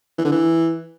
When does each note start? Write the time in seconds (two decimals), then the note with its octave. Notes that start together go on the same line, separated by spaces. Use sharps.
0.18 E3
0.25 D3
0.32 E3